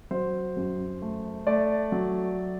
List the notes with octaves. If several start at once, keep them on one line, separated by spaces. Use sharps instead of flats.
F#3 C5
F#2
A3
A3 D5
F#3